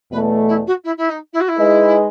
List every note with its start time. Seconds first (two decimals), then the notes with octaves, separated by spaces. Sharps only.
0.11 E2 B2 A3 B4
0.48 E4
0.67 F#4
0.84 E4
0.97 E4
1.09 D#4
1.33 E4
1.40 F#4
1.48 E4
1.58 G#3 D#4 G#4 B4 D#5